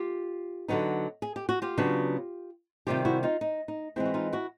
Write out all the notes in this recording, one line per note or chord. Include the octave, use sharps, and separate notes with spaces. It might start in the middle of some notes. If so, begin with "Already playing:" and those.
Already playing: F4 G4
D3 F#3 B3 D#4
G#4
G4
F#4
F4 G4
C#3 F#3 B3 D4
C3 D#3 G3 C4 F4 G4
E4 F#4
D#4 F4
D#4
D#4
E3 G#3 C4 E4
F#4
D#4 F4
E4 F#4